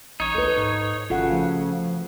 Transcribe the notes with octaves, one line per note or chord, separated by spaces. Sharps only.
A1 D#4 C#5
D2 A4 B4
G#2
G#1 C#3 F4 A4 F#5
F3 A3